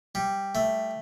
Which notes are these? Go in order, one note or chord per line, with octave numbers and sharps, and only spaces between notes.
G3
A3